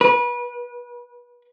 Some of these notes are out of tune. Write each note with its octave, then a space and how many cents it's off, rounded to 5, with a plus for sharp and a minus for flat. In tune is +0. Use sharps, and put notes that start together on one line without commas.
B4 -30